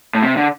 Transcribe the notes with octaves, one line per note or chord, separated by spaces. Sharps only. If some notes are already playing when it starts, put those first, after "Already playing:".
A2
C3
D3